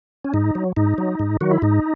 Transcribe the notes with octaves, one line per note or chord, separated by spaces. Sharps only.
C#4
G#2 D#4
F#3
G#2 D#4
F#3
G#2
D#3 F#3 F#4
E4
G#2 D#4